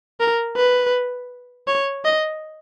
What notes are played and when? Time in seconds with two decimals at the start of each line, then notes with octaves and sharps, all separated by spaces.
0.20 A#4
0.57 B4
1.68 C#5
2.05 D#5